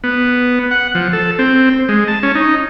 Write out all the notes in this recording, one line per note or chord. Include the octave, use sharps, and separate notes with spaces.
B3
F#5
F3
A4
C4
G#3
A5
C#4
D#4